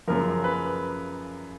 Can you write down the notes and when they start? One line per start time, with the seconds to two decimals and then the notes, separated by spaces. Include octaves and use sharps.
0.07 F#2 C#3 F3 A#4
0.44 B4